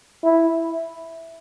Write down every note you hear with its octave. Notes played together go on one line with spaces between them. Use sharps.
E4